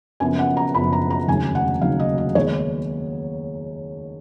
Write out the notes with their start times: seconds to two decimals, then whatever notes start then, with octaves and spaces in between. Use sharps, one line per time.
0.20 F#1 F#2 F3 B3 G#5
0.39 F#5
0.57 A#5
0.74 F#1 F#2 F3 B3 B5
0.93 A#5
1.10 A#5
1.28 F1 D#2 C#3 F#3 G#5
1.55 F#5
1.82 F1 D#2 C#3 F#3 F5
2.00 D#5
2.18 D#5
2.35 D#2 D#3 G#3 B3 C#5